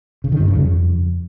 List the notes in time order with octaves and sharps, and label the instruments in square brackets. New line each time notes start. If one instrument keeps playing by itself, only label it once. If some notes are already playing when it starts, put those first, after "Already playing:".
[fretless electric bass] C#3
D#3
G2
C#3
F2